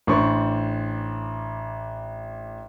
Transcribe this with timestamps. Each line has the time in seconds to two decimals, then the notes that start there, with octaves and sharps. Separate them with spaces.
0.07 A1 D4 C5 C#6